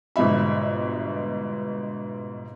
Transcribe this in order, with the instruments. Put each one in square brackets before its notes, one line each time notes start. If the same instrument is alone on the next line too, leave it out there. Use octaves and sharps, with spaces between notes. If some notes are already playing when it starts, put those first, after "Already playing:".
[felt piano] G1 G#2 B2 E5 B5